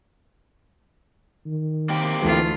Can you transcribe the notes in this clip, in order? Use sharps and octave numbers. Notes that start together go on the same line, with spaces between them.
D#3
A#3 C4 G4
D2 E3 A3 F4